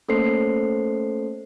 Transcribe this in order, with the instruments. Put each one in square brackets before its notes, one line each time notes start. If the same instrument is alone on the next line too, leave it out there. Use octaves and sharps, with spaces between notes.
[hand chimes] A3 A#3 C#4 A4 C5 C7